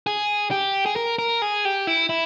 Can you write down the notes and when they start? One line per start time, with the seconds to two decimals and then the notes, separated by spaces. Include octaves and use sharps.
0.07 G#4
0.51 G4
0.86 G#4
0.96 A#4
1.19 A#4
1.42 G#4
1.65 G4
1.87 E4
2.09 E4